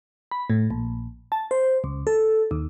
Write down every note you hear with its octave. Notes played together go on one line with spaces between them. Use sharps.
B5
A2
A#1
A5
C5
C#2
A4
D#2